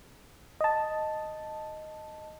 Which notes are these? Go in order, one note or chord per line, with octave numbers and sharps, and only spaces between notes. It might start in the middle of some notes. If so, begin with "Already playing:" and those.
D#5 A5